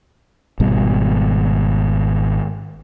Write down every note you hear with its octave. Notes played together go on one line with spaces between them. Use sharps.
G#1 B2 G3